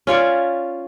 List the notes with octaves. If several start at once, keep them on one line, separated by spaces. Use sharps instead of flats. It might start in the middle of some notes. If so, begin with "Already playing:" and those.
C#4 F4 C#5 D5